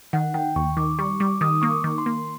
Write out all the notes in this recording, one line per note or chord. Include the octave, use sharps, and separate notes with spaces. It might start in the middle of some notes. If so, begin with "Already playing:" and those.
D#3 F#5
D#3 G5
D#2 C#6
D#3 D6
G3 C#6
G3 D6
D#3 D#6
A#3 C#6
D6
D#3
C6
A#3